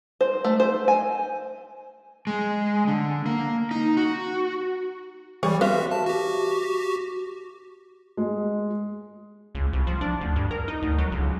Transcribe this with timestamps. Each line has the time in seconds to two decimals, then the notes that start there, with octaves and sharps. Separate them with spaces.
0.21 C5
0.44 A3
0.60 C5
0.88 G#5
2.27 G#3
2.87 D3
3.26 A#3
3.71 D#4
3.97 F#4
5.43 E3 G3 G4 C#5
5.61 F#4 B4 C5 E5 F5
5.91 A5
6.06 F#4 G4
8.17 G#3
9.55 C#2
9.73 C2
9.87 F3
10.01 D4
10.21 D2
10.36 G2
10.51 A#4
10.68 D#4
10.82 D2
10.98 F#3
11.12 C#2